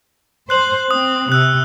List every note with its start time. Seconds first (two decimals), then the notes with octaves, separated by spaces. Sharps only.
0.50 C5 F#6 F#7
0.91 C4 D#6
1.32 C3 E6 F#6